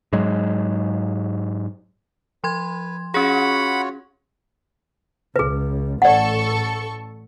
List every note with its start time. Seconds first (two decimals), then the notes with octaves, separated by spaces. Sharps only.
0.13 G#2 F#3 G#3
2.44 F3 B4 C6 G#6
3.14 C#4 F4 F#4 G#4 C#5 F#5 B5
5.36 C#2 G#4 B4
6.02 A1 A4 D5 F#5 C#6